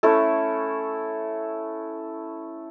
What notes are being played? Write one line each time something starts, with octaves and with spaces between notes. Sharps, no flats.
A3 C#4 E4 A4